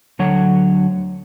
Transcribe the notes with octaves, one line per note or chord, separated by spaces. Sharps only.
D2 D3 F#3 C#5 F#5